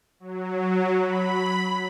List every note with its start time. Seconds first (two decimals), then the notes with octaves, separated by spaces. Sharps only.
0.20 F#3
0.98 B5